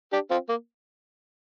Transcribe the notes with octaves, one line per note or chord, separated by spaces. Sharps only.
D4 G4
C4 F4
A#3